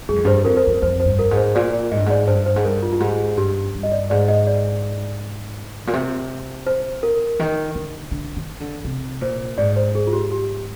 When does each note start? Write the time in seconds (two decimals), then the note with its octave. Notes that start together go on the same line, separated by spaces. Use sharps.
0.09 G2 G#4
0.16 F2
0.25 G2 C5
0.45 F2 A#4
0.57 C5
0.63 A#4
0.67 F2
0.82 F2 C5
1.00 C5
1.05 G2
1.19 A#4
1.31 G#2
1.37 C5
1.55 A#2 D5
1.73 D5
1.91 G#2 D#5
1.98 G2
2.06 G#2 D5
2.27 G2 C5
2.46 C5
2.56 G#2
2.64 G2 A#4
2.82 F4
2.93 F4
3.00 G#2 G4
3.37 G2 G4
3.74 G2
3.83 D#5
3.92 D5
4.10 G#2 D5
4.28 D#5
4.47 D5
5.87 A#2
5.93 C3
6.67 C5
7.03 A#4
7.39 D#3
7.75 D3
8.11 D3
8.37 D#3
8.60 D3
8.84 C3
9.21 A#2 C5
9.58 G#2 D5
9.76 C5
9.95 G#4
10.07 F4
10.13 G4
10.32 G4